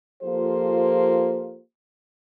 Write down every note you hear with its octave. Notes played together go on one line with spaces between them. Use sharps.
F3 A#3 F4 G4 A4 C5